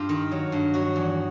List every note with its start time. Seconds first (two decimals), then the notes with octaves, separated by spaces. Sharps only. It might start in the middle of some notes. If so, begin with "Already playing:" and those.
Already playing: G2 F4 G4
0.09 D#3
0.31 F#3
0.52 G2
0.74 F#3 F#4
0.96 E2